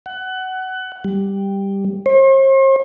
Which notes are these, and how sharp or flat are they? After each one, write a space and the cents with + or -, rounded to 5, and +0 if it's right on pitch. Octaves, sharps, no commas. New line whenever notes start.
F#5 +20
G3 +5
C5 +45